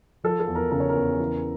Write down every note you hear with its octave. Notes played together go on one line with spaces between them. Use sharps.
F3 A4
A4
E2
A#4
C#3 A#4
C#5
A#4
E2
E3